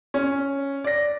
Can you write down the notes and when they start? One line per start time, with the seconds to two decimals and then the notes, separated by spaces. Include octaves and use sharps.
0.14 C#4
0.84 D5 A#6